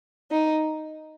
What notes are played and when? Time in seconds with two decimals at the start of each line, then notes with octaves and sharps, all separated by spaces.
0.31 D#4